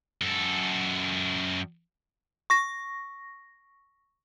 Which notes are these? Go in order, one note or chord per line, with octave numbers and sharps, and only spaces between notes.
F#2 A4
C#6 A#6